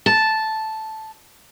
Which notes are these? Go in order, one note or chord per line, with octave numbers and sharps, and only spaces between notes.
A5